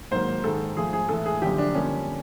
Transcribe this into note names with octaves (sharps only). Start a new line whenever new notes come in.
G#2 D#3 F#3 A#3 C5
G#2 D#3 G#3 A4
G#2 F3 A3 G#4
G#4
A2 E3 G#3 A4
G#4
F#2 D3 F3 G4
D4
F2 D3 G3 A#3 C#4